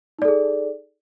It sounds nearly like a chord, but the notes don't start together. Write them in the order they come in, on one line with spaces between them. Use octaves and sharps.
D#4 D5 A4 G#4